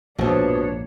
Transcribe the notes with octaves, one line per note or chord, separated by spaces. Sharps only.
A#1 F2 G#2 B2 F3 D4 C#5